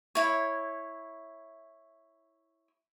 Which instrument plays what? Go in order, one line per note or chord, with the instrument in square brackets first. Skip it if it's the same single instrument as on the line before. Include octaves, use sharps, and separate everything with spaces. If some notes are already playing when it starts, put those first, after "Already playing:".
[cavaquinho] E4 C#5